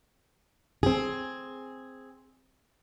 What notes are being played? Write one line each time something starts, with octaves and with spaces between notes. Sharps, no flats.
C4 G#4